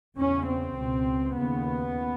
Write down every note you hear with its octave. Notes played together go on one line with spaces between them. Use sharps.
E2 C#3 C#4
C4
C#2 B2
D#2 C#3 B3